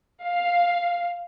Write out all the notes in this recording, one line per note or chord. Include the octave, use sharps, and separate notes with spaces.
F5